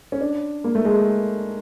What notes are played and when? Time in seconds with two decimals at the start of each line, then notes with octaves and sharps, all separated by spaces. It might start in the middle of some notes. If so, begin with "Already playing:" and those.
0.12 C#4
0.21 D4
0.64 A#3
0.75 A3
0.85 G#3